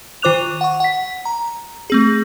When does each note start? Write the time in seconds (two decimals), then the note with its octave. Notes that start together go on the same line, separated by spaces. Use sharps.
0.22 D#3 F4 C5 D6 F#6 F7
0.61 F#5 C#6
0.80 F#5 B6
1.25 A#5
1.90 A3 C4 G#4